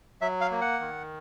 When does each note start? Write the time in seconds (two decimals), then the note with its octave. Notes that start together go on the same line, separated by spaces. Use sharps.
0.21 F#3 E5
0.41 F5
0.51 A#3
0.61 F#5
0.80 D#3